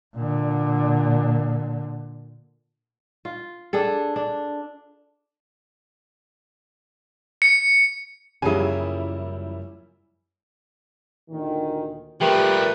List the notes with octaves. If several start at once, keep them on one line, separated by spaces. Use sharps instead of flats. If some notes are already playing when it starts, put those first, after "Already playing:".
A#2 D3
F4
D4 G#4 A4
D4
C#7
F#2 C#3 F3 G3 A#3 E4 G#4 G#5
D2 A#2 D#3
A#2 F3 G3 A3 F4 G4 A#4 B4